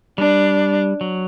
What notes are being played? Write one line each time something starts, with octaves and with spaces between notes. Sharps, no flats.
G3 D4
F#3